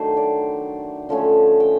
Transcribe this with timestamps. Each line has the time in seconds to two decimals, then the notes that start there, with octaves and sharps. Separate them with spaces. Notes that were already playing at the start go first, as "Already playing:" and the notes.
Already playing: D#3 F#3 A3 D4 C5
0.17 D5
1.09 D3 F3 A3 C#4
1.60 G5